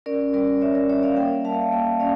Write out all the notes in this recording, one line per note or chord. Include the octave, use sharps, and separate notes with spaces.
C#4 A#4 D5
G3 A#4 D5
C#4 C#5 E5
A#4 D5
G3 C#5 E5
D5 F5
A#3 E5 G5
G3 F5 A5
A#3 E5 G5
C#4 D5 F5